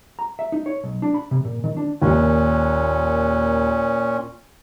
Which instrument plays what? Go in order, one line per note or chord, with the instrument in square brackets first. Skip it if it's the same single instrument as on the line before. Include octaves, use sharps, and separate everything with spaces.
[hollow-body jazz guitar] A#5
E5
D#4
C#5
B1
D4
B5
C3
A#2
D#3
D4
[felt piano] D#2 [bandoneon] A#2 C#4